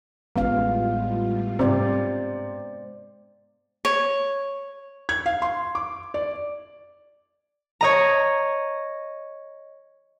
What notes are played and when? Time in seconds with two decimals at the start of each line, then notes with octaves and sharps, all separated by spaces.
0.36 A1 A2 G3 G#3 B3 F4 F5
1.59 G#2 C3 C5 D5
3.85 C#5
5.09 G#6
5.26 F5
5.42 C6
5.75 D6
6.14 D5
7.81 C#5 D#5 A#5